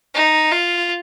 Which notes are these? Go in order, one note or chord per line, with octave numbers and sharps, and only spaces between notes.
D#4
F4